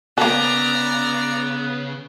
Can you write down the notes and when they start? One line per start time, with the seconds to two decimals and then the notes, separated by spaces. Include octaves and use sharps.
0.18 C#3 A#3 B3 A4 D5 A#5